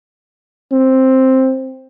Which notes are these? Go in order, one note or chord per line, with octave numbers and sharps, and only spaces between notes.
C4